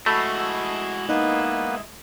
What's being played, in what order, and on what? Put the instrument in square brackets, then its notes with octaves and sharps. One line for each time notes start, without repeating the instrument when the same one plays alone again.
[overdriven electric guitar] G#3 E4 [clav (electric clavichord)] A3 [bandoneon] F#4 [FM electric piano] A5 B5 E6
[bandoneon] A#3 B3 B4 [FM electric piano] D#4 D#5